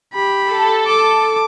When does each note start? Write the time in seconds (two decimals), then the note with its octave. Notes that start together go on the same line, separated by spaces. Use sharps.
0.14 G4 B5
0.49 A4
0.87 D6